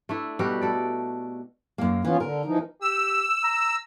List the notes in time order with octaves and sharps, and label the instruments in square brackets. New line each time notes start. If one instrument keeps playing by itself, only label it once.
[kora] A3 D4 E4
B2 G3 F#4 G4
A4 D5
[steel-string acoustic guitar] F#2 A#3
[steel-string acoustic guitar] E3 [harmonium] B3 C#4 F4
[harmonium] D3 [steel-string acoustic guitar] A#4
[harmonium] E3 F3 D#4
[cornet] G4 [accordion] E6
[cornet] A#5